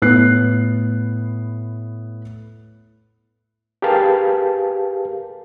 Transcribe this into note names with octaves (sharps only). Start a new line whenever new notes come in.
A2 B3 F#6 C7
G4 G#4 A#4 B4 F5 A5